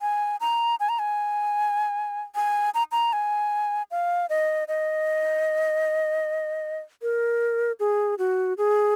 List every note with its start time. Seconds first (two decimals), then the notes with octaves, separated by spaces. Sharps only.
0.01 G#5
0.40 A#5
0.80 G#5
0.89 A#5
0.99 G#5
2.35 G#5
2.74 A#5
2.92 A#5
3.13 G#5
3.91 F5
4.30 D#5
4.68 D#5
7.02 A#4
7.80 G#4
8.18 F#4
8.58 G#4